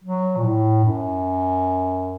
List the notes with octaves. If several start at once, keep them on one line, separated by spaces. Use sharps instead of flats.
F#3
A#2
A2
F#2